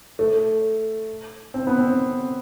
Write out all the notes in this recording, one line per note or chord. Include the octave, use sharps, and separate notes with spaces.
A3
C4
B3
C4